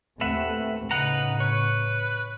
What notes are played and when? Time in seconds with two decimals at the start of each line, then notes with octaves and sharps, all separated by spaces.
0.21 D#2 A3 C4 B4 E5 F#5
0.91 A2 C#3 D#4 B4 F#5 A#5
1.40 B4 C#5